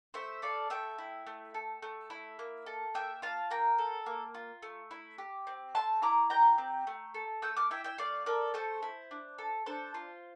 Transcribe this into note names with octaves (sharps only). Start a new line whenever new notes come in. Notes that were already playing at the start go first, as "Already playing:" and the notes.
A3 C5 E5
A4 D5 F5
A3 E5 G5
E4
A3
A4
A3
E4
A#3
A4
A#3 E5 G5
F4 F5 A5
A#3 G5 A#5
A4
A#3
F4
A3
E4
G4
C4
A3 A5 C6
E4 A#5 D6
G4 G5 A#5
C4
A3
A4
A3 E6 G6
D6 F6
E4 E5 G5
E5 G5
A3 D5 F5
A4 A#4 D5
A3 A4 C5
E4
D4
A4
D4 A4 C5
F4